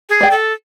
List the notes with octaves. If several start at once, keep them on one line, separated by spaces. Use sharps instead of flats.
G#4
D5 G5
A4